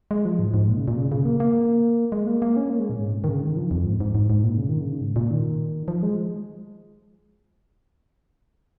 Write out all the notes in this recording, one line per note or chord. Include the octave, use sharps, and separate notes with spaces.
G#3
F3
G#2
G#2
A#2
C#3
A#2
C#3
C#3
A#3
A#3
G#3
A#3
A#3
C#4
A#3
G#3
A#2
G#2
D#3
C#3
D#3
F3
F2
G#2
G#2
G#2
G#2
A#2
C#3
D#3
C#3
G#2
A#2
D#3
F3
G#3